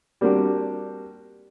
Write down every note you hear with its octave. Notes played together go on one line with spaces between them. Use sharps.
G3 A#3 C4 D4 F#4 G4